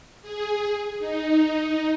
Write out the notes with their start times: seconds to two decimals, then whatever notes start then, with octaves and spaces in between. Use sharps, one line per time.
0.22 G#4
0.99 D#4